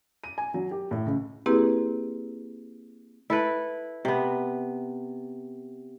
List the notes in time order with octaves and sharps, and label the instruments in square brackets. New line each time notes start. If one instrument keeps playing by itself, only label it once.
[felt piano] D#7
G#5
F#3
G4
A2
C#2
[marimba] A#3 C4 E4 G4 G#4 B4
[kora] E4 A4 B4
C3 B3